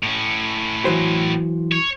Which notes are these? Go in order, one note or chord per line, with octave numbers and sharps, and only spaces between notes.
A2 C#4
E3 F#3 C5
C#5